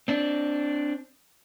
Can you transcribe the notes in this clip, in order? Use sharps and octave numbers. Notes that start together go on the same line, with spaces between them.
C4 D4